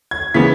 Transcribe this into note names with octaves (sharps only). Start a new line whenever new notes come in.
G#6
C#3 E3 B3 B6